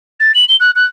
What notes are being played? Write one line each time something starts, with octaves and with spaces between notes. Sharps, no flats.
A6
F#7
G7
F#6
F#6